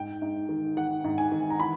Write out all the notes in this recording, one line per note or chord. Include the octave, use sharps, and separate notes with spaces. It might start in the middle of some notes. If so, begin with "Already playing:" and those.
Already playing: G#2 G5
G#2
D#3
D#3 F#5
G#2
G#5
D#3
A#5
E3 B5